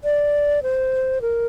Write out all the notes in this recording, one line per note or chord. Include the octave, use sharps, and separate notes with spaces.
D5
C5
A#4